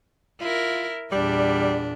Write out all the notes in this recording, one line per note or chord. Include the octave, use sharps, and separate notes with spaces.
E4 F4 A#4
E2 A#2 G3 D4